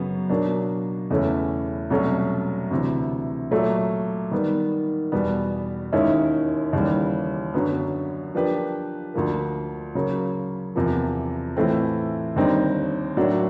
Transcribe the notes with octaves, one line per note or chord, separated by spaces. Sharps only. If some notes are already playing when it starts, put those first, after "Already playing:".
Already playing: F#2 C#3 F#3 B3
B2 F#3 A#3 D4
E2 C#3 E3 A3 C#4
C2 B2 F#3 A3 C#4
D2 C3 E3
A#2 F#3 A3
D#3 G3 B3
E2 B2 G3 B3
D#2 D#3 G#3 C#4 E4
D#2 C#3 E3 G3
F#2 D3 F#3 B3
F3 A#3 D4 G4 B4
D2 D3 F3 A#3
C#3 F#3 A#3
E2 C3 F3 A#3
A2 E3 A3 C4 F4
D#2 D3 G3 C4 D#4
A2 F#3 A#3 D4 F#4